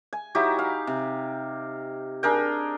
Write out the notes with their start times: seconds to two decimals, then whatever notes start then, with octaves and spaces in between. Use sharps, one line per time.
0.13 G#5
0.35 F#3 D#4 E4 G4
0.59 F5
0.87 C3
2.23 D4 G#4 A#4 G5